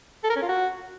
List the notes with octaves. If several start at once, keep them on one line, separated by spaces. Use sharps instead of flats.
A4
A#4
C#4
F4
F#4